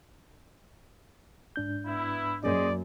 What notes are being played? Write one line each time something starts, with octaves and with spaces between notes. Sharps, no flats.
G#2 D4 G6
B3 E4
F#2 A#3 C#4 G#4 C5 D5 D#5